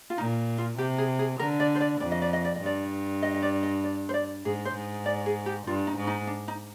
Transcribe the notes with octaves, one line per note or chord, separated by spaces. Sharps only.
F4
A#2 D#4
F4
C3 G4
G#4
G#4
D3 A#4
D5
C5
D5
F2 D5
D#5
D5
D#5
D5
D#5
G2 D5
D#5
D#5
D5
D#5
D5
C5
D5
G#2 G#4
C5
G#2
D5
G#4
G4
G2 F4
D#4
G#2
D#4
D4
D#4